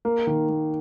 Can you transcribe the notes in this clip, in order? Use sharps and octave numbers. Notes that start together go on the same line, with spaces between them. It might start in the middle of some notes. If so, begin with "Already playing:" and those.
A#3
D#3
A#3